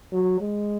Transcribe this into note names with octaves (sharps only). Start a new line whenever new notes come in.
F#3
G#3